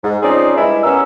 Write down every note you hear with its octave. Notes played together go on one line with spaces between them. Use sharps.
G#2
F3 C4 C#4 D#4 G#4 D5
G2 G3 G#3 E4
G2 B3 C#4 A#4 E6